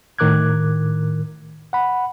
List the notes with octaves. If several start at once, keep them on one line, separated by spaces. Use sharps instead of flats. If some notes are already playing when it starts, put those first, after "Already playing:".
A2 D#3 A#4 D6 F#6 G#6
F#5 B5